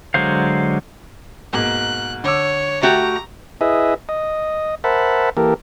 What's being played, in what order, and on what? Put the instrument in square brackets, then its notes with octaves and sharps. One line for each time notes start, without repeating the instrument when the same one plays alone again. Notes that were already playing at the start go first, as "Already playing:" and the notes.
[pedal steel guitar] D3 F#3 G#3 C5 F5
[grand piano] G#2 B2 A#3 [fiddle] F#6
[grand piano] D3 D6 E6 [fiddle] C#5
[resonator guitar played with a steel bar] A3 F#4 G4 [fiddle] A#5
[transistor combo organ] E4 G#4 B4 D#5 E5
D#5
A#4 C5 E5 F#5 A5 B5
E3 A#3 G4 A4 A#4